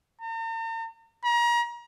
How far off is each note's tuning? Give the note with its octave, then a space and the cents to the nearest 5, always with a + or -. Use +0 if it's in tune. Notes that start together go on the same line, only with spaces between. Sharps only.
A#5 -45
A#5 +35